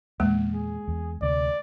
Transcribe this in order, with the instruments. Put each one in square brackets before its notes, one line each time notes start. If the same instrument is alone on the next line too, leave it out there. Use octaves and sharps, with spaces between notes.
[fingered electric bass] E2 A#2 [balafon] G#3 A#3
[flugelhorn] G#4
[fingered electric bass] E2
[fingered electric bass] D2 C3 [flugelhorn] D5